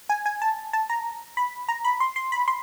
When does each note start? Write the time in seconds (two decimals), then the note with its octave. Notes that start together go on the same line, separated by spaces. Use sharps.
0.09 G#5
0.26 G#5
0.42 A5
0.73 A5
0.90 A#5
1.37 B5
1.69 A#5
1.84 B5
2.00 C6
2.16 C6
2.32 B5
2.48 C6